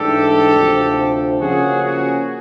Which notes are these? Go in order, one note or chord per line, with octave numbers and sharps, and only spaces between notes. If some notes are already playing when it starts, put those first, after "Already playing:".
Already playing: G#2 E3 A3 D4 G4 A4
D2 C3 F3
C#3 F3 A#3 C#4 F#4 G#4
F#4 G#4